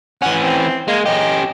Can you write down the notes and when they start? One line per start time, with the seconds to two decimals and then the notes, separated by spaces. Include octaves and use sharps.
0.22 E3 C#4 F#5
0.40 C4
0.88 G#3 A#3
1.06 C#4 G4 D#5